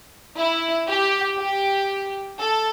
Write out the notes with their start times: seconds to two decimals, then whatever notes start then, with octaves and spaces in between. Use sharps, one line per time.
0.38 E4
0.88 G4
1.38 G4
2.39 A4